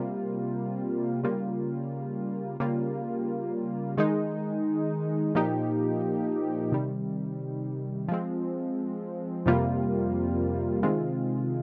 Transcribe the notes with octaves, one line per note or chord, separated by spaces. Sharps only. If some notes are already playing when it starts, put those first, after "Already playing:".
Already playing: C3 G3 A#3 F4
C#3 G3 A#3 F4
C#3 G3 A#3 F4
D#3 G#3 D#4
A#2 F3 A#3 D#4 G4
C3 D#3 G3
F3 G#3 C4
F2 C3 G3 A#3 F4
C3 D#3 G#3 C4 F4